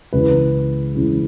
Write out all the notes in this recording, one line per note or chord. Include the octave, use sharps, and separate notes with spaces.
C#2 C#3 E3 B4
C#2 C#3 E3